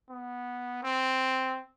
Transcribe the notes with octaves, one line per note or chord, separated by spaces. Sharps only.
B3
C4